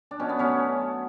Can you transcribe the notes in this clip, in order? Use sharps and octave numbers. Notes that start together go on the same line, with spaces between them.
D4
B2 C#4
B3
F#3 A3 C#4